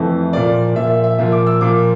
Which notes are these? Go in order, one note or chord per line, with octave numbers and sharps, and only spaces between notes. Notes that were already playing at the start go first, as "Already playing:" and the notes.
Already playing: F2 E3 A3
A#2 F3 A#3 D5
A#2 F3 A#3 E5
E5
E5
A#2 F3 A#3 E5
D6
E6
A#2 F3 A#3 D6